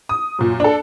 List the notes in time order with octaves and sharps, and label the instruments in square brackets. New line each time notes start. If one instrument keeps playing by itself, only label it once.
[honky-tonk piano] D#6
F#2 A#2
D4 A4